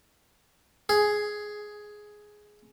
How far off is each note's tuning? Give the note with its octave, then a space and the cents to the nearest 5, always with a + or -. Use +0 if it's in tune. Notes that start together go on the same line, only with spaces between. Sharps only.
G#4 +5